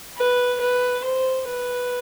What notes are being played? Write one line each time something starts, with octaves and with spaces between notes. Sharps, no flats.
B4
B4
C5
B4